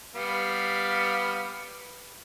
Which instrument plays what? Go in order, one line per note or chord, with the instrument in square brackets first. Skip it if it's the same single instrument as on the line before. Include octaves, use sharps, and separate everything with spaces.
[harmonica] G3 B3 F5